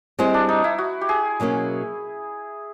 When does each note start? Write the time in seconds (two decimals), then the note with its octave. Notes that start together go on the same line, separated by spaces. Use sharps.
0.19 G3 G#3 C4 E4 G4 C5
0.34 D4
0.49 D#4
0.64 E4
0.78 F#4
1.01 G4
1.09 G#4
1.40 B2 F#3 A#3 C#4